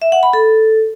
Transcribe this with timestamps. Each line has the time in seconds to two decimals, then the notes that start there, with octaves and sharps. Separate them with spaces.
0.02 E5
0.12 F#5
0.23 B5
0.33 A4